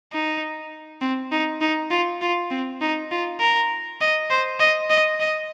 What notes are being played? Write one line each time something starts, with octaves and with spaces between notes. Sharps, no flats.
D#4
C4
D#4
D#4
F4
F4
C4
D#4
F4
A#4
D#5
C5
D#5
D#5
D#5